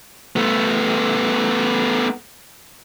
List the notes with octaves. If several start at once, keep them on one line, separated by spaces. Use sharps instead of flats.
A3 B3